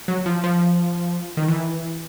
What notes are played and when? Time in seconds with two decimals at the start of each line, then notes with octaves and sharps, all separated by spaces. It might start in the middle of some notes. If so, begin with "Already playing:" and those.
0.08 F#3
0.26 F3
0.44 F3
1.37 D#3
1.48 E3